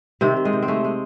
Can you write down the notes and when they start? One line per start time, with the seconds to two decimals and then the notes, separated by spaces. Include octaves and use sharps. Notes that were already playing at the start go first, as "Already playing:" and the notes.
0.21 C3 D#3 C4
0.37 C3
0.45 G#3
0.53 C3
0.62 C4
0.68 G#3 A3
0.84 G#3